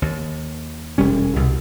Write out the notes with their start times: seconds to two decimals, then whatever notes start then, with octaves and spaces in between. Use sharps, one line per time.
0.02 D#2
0.98 E1 G3 C#4
1.36 C2 B2